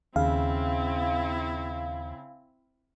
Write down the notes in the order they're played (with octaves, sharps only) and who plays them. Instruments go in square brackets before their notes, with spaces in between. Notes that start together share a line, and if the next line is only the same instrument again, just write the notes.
[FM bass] D#2 [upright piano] C#3 [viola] C4 E4 [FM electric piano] F5